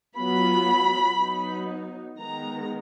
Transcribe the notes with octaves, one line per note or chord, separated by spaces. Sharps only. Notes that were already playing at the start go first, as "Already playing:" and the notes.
F#3 B3 F4 B5
F#3 B3 D#4
D#3 G#3 B3 A#5